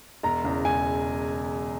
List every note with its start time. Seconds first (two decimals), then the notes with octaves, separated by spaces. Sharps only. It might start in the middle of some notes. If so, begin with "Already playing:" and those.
0.23 E1 A#5
0.44 E2 C#3
0.65 E1 G#5